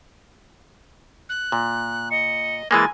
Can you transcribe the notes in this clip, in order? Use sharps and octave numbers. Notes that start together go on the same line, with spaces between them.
F#6
A#2
D#5 C#7
E3 G#3 A#3 G#5 A6